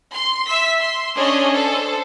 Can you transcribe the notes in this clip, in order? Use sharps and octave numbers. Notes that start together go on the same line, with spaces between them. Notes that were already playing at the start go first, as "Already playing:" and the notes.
C6
E5 E6 B6
C6
C#4 D4 G#4 C#5 D#5
A4 C5